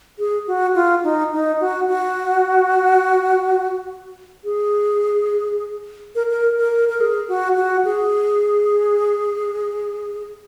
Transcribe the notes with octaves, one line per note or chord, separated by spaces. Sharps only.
G#4
F#4
F4
D#4
D#4
F#4
F#4
G#4
A#4
A#4
A#4
A#4
G#4
F#4
F#4
G#4